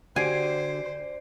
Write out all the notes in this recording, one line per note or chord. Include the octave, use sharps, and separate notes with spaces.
D3 F#4 G4 C5 D5 G#5 C7 D7